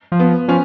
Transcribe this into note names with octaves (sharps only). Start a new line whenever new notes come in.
F3
B3
F3 C#4